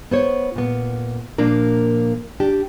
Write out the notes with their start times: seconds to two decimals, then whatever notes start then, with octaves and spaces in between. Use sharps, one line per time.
0.11 B3 C5 C#5
0.56 A#2 B3
1.38 A#2 F3 A#3 D4 A#4
2.40 D4 G4